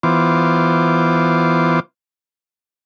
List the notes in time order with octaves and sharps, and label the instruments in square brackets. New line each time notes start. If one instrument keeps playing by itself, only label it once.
[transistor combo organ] E3 B3 F4 C5 D6